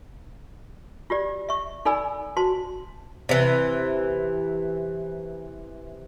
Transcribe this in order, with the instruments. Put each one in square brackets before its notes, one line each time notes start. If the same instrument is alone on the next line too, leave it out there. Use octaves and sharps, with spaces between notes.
[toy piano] F4 G4 D5
E5 C#6
D#4 A4 D5 G#5 B5 E6
F#4 C5 A5 C6
[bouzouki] C3 E3